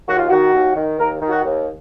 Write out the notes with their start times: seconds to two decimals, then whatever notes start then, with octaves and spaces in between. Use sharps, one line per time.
0.08 D#2 F#4
0.18 F4
0.29 D#3 F#4
0.53 D#2
0.76 D#3
0.99 D#2 A#4
1.22 D#3
1.29 F#4
1.44 D#2